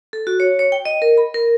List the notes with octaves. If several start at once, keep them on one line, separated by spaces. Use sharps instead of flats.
A4
F#4
C#5
C#5
G5
D#5
A#4
B5
A#4